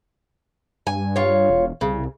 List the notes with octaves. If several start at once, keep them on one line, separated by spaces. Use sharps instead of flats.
G2 G#5
F4 C#5
E1
C2 C#3